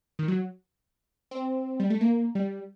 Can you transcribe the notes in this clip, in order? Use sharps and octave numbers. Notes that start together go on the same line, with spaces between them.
D#3
F#3
C4
G3
A3
A#3
G3